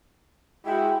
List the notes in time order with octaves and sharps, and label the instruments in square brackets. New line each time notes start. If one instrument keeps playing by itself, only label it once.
[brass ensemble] G#3 E4 F#4 [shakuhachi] G5